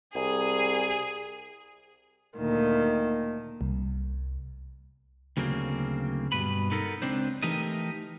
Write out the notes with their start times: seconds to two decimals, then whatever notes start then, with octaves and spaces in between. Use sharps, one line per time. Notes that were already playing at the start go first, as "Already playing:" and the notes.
0.15 C2 G#4
2.37 D2 A#2 D#3
3.61 C2
5.37 D2 C#3 F#3 A#3 C4
6.32 G2 B2 B4 B5
6.71 B3 D#4 A4 A#4
7.02 C#2 C4 D4 C5
7.42 E3 A3 D#4 G4 A#4 D#5